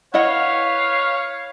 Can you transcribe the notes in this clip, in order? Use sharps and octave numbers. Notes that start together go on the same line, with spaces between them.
E4 B4 C#5 D#5 F5 F#5